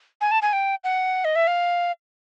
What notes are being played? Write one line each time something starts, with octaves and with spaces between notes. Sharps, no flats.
G#5
A5
G#5
G5
F#5
D#5
E5
F5